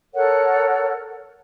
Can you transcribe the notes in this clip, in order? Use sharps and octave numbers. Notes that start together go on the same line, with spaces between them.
A4 A#4 C#5 F#5